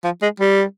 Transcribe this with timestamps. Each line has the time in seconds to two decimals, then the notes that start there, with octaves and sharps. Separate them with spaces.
0.04 F3
0.22 G#3
0.40 G3